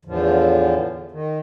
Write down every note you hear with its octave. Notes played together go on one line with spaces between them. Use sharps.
E2 A2 D3 F3
D#3